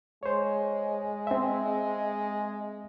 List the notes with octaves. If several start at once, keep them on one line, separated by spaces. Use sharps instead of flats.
G#3 C5 C#5
C4 E5